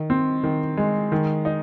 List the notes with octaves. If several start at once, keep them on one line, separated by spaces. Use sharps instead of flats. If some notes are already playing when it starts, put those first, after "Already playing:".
Already playing: D#3
C4
D#3
G#3
D#3
D#4